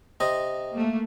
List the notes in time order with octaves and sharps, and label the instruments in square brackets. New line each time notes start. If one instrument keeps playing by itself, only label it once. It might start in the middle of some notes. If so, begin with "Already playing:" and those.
[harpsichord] C3 C4 [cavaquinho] D#5
[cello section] A3 A#3